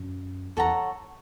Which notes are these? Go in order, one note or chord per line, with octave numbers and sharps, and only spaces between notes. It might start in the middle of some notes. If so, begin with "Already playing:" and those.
Already playing: F#2
E2 A4 C#5 F#5 A#5